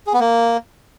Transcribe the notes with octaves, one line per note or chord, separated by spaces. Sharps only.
G#4
B3
A#3